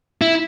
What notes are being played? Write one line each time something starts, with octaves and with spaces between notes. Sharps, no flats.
E4